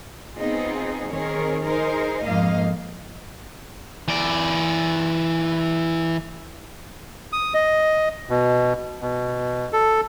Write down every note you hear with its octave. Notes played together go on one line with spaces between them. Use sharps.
B3 C4 D#4 F4 G#4
D#3 C4 G#4 A#4 C#5
D#4 G#4 A#4 C5
F2 G#2 A#3 D#4 D#5 F5
E3 D5
D#6
D#5
B2
B2
A4